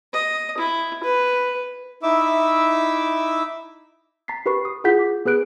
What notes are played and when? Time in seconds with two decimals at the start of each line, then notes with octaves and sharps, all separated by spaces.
0.13 D#5
0.58 E4
1.03 B4
2.03 D#4 E4 E5 D6 E6
4.28 A#5 A6 B6 C7
4.46 G4 A#4 B4 B5 C#6 C7
4.65 D#6
4.84 E4 F4 G#4 F#5 G6 B6
4.99 D6
5.25 B3 G#4 B4 F#6 D7